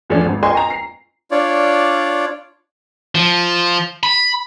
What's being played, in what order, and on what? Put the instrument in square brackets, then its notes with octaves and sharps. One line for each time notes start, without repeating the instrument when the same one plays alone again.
[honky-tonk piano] E2 F3 A3 C#4 D4
G#1
A#4 D#5 G5 G#5 C6 C#6
A#5
C7
[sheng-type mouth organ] D4 F4 C#5 D5
[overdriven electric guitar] F3
B5